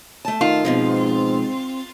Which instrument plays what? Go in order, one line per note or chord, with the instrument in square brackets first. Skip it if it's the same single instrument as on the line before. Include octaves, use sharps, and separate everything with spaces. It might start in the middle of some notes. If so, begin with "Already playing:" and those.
[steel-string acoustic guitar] A3 A5
[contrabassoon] D#3 [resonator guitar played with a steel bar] F4
[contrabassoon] G#2 [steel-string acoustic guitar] B2 F3 G#3 [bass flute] C4